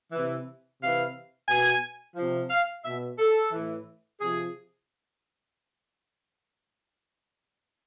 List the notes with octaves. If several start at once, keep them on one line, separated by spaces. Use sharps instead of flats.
C3 E3
C3 E3 F5
B2 G#5
C3 F3
F5
B2 E5
A4
A2 E3
C3 F3 G#4